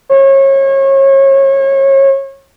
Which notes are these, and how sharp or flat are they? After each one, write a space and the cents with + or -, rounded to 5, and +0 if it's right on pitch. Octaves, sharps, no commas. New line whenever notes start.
C#5 -30